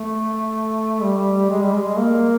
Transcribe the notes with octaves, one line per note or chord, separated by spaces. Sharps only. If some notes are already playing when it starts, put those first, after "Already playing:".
Already playing: A3
G3
G#3
G3
G#3
A#3